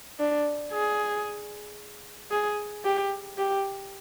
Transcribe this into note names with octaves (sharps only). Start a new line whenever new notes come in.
D4
G#4
G#4
G4
G4